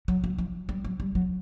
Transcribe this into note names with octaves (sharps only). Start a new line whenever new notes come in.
F#3
F#3
F3
G3
F#3
G3
F#3